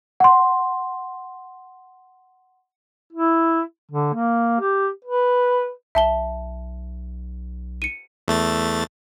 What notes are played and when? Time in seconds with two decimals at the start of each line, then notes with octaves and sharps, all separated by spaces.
0.20 F#5 C6
3.13 E4
3.91 D3
4.14 A#3
4.60 G4
5.04 B4
5.95 B1 E5 A5 G7
7.82 C#7 D#7
8.28 E2 A3 A6